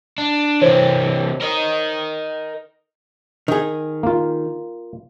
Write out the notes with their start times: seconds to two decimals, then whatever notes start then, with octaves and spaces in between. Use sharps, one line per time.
0.18 D4
0.62 C3 E3 C5 C#5
1.41 A#4 D#5
3.48 D#3 G#4
4.03 A#3 F4